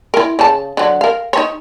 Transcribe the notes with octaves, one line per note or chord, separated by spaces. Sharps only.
E4 A#4
C#3 A5
D3 F#3
A#4 F5
D#4 C#5